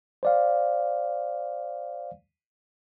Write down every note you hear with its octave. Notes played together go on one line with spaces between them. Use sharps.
C5 D5 F5